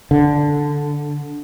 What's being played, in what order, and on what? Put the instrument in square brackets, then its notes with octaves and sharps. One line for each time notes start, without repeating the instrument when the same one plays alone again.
[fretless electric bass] D3